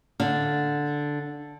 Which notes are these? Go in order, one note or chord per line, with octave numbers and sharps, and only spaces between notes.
D3 F5